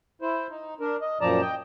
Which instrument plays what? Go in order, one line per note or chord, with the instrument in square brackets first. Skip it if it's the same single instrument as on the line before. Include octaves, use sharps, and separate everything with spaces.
[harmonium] E4 C5
D#4
D4 A#4
D#5
F#2 A#2 F3 D5 A5 A#5
D#5 G5